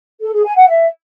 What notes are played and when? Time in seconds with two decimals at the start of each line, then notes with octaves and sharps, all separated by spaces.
0.22 A4
0.33 G#4
0.44 G#5
0.56 F#5
0.67 E5